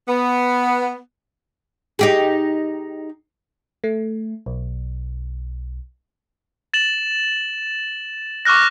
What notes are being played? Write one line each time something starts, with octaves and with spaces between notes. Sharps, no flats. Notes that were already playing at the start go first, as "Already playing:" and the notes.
B3
D#4 G4 G#4
A3
B1
A6 E7 F#7
C#6 D6 F6 F#6 A#6